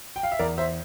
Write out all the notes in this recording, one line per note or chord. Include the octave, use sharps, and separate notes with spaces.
G5
F5
E5
E2 A#4 D5
C5 E5